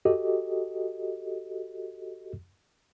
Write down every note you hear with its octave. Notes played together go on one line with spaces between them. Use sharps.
F#4 G4 A4 D#5